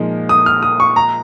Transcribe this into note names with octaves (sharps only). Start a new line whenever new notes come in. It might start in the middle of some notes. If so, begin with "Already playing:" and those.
Already playing: A#2 F3 G#3 D#4
D#6
F6
D#6
C#6
A#5